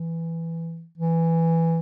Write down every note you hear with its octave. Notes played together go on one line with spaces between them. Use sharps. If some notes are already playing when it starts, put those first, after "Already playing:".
Already playing: E3
E3